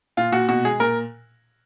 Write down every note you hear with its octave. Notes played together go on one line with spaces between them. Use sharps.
A#2 F4
A#2 F#4
B2 F#4
G#3 G#4
A#2 A#4